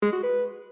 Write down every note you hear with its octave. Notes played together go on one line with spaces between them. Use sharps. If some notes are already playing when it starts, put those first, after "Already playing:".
G#3
F#4
B4